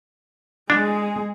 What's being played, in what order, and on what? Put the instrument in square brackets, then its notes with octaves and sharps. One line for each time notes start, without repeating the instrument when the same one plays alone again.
[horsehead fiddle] G#3 G#4 [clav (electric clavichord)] D4